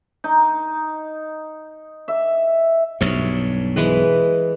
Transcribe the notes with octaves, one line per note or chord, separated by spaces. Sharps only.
D#4
E5
B1 G2 C#5
E3 G#3 B4